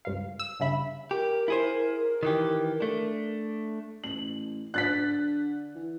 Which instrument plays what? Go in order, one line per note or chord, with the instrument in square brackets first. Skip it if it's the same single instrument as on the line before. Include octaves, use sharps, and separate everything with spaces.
[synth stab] C#2 G2 F5
E6
E2 G2 C#3 E5 B5
[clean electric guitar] G4 [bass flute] A#4
[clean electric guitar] E4 G#4 C5
D#3 E3 G4
A3 D4
[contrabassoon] A1 [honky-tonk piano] F#7
[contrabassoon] D3 [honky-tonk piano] F#6 A6 B6
[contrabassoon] E3